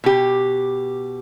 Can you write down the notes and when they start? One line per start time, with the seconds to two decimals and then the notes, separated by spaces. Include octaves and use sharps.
0.04 B2 G4